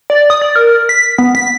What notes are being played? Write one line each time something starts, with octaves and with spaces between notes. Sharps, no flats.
D5
D#6
D5
A#4
B6
B3
B6